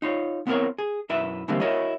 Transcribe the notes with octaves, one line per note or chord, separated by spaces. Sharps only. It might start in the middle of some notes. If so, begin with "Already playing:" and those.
D#4 F4 C#5
B3 C4 E4 A4 A#4 C#5
G#4
B1 F#2 E4 B4 E5
G#2 D3 E3 G3 A#3 C4
E4 F#4 A#4 C#5 D#5